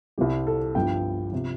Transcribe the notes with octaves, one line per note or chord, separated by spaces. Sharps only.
C2 C3 G3 G4
A4
G1 G2 F3 G5
C3 F3